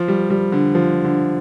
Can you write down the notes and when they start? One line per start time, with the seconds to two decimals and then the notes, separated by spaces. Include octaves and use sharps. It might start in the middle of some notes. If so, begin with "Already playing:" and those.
Already playing: F3
0.08 G3
0.30 G3
0.52 D3
0.75 F3
1.05 D3